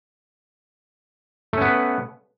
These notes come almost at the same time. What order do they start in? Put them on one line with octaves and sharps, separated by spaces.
A3 C#4 B3 B4